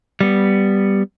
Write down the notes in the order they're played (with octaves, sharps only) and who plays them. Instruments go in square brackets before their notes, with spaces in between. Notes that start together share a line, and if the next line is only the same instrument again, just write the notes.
[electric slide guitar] G3 B3